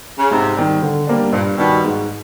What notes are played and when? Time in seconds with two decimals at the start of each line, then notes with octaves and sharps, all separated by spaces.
0.19 C#3
0.31 G#2 C3
0.56 D#3 G3
0.82 D3
1.07 G3 A#3 D4
1.32 G2 A#2
1.58 B2 D#3 G3
1.84 G#2